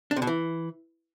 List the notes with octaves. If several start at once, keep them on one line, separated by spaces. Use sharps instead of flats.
D4
C3
B2
E3